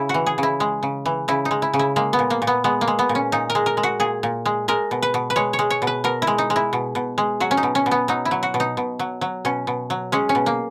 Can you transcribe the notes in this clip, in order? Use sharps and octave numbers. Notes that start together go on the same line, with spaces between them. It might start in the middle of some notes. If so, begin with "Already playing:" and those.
Already playing: C#3 E4
F#4
E3
G#4
C#3
E4
G#3
C#3
E3
C#3 E4
D#4
G#3
E4
C#3
E4
G#3 A#3
B3
A#2
A#3
A#2
B3
G#3 B3
A#3
G#3
B3
A#2
C#4
A#2 D#4
A#4
G#3
A#4
G#3
F#4
A#2 G#4
A#2
G#3
G#3 A#4
B2
B4
B2
B4
G#3 C#5
C#5
G#3
C#5
B2
B4
B2 A#4
E4
G#3
D#4
G#3
E4
B2
B2
G#3
F#3 F#4
C#4
D#4
B2
C#4
B2
B3
F#3 D#4
E4
F#3
F#4
B2
D#4
B2
F#3
F#3
B2 C#4
B2
F#3
G#3 C#4
C#4
B2
A#3